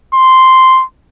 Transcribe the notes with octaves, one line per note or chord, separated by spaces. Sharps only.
C6